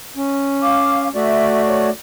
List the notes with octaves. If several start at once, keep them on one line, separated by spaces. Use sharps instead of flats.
C#4
F5 D6
A3 F#4 D5 E5
C#5